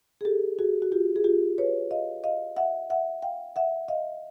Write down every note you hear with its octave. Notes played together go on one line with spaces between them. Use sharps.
G#4
G4 A4
F#4 G#4
F#4
F4 G4
G#4
F4 G4
B4 C#5
D#5 F5
D#5 F5
E5 F#5
E5 F#5
F5 G5
E5 F#5
D#5 F5